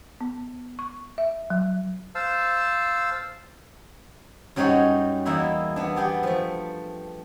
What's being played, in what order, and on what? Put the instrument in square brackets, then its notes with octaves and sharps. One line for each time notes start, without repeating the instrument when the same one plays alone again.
[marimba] B3
C#6
E5
F#3
[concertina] C5 F5 A5 E6
[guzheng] F#2 F#3 G3 D#4 G#4 C#5
E2 A#3 D#4 E4 A#4 B5
B3 D4
B3 G4 G#4 D5
F3 A3